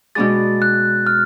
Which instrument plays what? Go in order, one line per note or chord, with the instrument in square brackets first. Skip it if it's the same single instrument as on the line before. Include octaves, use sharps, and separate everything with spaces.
[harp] B2 G#3 B3 D4 G#4 [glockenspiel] A6
[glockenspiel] F#6
F6